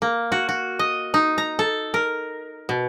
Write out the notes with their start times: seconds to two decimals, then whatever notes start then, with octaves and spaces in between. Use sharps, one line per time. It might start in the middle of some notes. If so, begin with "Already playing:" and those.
0.02 A#3
0.32 F#4
0.49 F#4
0.79 D#5
1.14 D#4
1.38 A#5
1.59 A4
1.94 A#4
2.69 B2